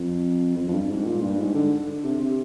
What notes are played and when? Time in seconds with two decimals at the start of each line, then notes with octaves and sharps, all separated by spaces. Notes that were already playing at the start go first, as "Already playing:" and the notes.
Already playing: F2
0.57 F2
0.68 F2
0.73 G2
0.90 G#2
1.06 A#2
1.22 G2
1.39 G#2
1.55 D3
1.80 D3
2.05 C3
2.21 C3